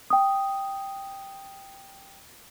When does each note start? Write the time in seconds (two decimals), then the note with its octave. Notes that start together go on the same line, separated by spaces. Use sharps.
0.10 G5 D#6